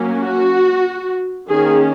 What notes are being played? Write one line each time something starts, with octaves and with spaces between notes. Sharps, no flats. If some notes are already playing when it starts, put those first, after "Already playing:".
Already playing: F#3 A#3 C#4
F#4
D#3 A#3 C#4 G#4